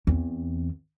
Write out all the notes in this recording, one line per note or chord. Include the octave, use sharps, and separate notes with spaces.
E2 C4